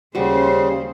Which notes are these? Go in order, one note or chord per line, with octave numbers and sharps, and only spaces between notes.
D#2 C#3 G3 C#4 F#4 C5